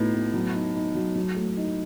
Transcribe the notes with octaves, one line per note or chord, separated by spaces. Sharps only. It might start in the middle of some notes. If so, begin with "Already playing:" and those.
Already playing: A2 B3 D#4 F#4
B3
F#3
D#4
D#4
F#3
F#3
A3
D#4